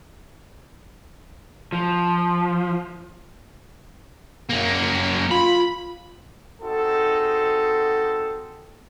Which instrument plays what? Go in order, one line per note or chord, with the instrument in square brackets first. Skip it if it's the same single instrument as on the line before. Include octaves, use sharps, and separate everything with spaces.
[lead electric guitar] F3
[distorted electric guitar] F#2 A#3
[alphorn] F4 [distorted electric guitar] B5
[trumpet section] C4 D#4 F#4 G#4 A4